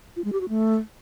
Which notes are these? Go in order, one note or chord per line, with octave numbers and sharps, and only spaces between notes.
F4
G#3
G4
F#4
A3